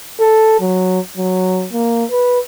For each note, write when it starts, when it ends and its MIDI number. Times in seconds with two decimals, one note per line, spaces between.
0.20 0.57 69
0.60 0.99 54
1.17 1.66 54
1.73 2.04 58
2.11 2.39 71